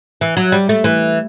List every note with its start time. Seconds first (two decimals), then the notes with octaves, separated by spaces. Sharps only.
0.21 E3
0.37 F#3
0.52 G3
0.69 A3
0.84 E3